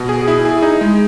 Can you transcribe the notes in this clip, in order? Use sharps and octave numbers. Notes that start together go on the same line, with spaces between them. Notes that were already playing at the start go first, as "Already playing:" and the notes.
Already playing: B2
G#4
E4
G#4
D#4
G#3